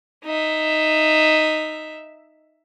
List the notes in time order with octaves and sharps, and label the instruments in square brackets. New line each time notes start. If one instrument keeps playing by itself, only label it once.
[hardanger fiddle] D#4 E5